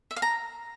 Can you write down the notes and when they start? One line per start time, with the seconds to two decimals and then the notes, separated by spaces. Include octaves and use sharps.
0.11 E5
0.16 F5
0.22 A#5